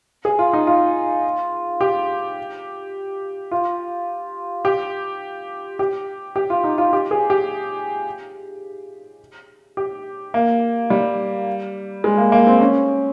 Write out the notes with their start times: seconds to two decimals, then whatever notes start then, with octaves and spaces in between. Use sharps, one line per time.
0.25 G#4
0.39 F4
0.53 D#4
0.67 F4
1.81 G4
3.51 F4
4.65 G4
5.79 G4
6.36 G4
6.50 F4
6.64 D#4
6.78 F4
6.93 G4
7.11 G#4
7.30 G4
9.77 G4
10.34 A#3
10.90 G3
12.04 G#3
12.18 A#3
12.32 A#3
12.47 C4
12.61 C#4